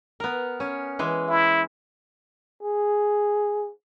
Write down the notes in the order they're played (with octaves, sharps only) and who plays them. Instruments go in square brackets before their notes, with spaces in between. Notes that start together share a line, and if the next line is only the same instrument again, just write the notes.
[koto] B3 A#4
C#4
E3 G#3
[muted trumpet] E4
[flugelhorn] G#4